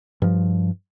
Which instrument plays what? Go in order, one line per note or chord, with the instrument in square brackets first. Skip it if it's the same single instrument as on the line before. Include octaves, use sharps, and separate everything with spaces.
[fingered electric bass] G2 F3